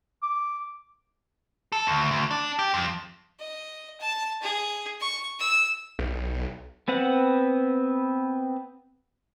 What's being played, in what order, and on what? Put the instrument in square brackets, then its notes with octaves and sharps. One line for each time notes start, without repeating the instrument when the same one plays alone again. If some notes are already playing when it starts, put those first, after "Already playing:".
[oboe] D6
[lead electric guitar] A4
D2
D2
D4
G4
F2
[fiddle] D#5
A5
G#4
C#6
E6
[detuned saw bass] B1
[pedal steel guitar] B3 C4 B4 F#5